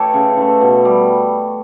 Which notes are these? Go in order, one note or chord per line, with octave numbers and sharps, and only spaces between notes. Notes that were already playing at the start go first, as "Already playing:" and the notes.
Already playing: E3 A3 G4 A4 C#5
C#3
E3 A3
B2
G3